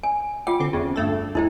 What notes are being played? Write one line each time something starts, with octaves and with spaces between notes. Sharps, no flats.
G#5
F4 F#5 G5 D6
D3 C4
E2 C#3
G2 A3 A4
D#2 G#3 D#4 E4 G5